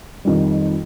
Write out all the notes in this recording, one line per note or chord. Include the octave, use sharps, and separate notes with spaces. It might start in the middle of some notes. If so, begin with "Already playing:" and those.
F2 D#3 G3